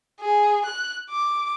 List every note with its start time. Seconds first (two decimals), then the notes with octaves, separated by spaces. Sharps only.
0.21 G#4
0.65 F#6
1.10 D6